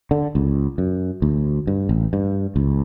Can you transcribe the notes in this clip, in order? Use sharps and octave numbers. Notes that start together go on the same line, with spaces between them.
D3
C#2
F#2
D2
G2
A1
G2
C#2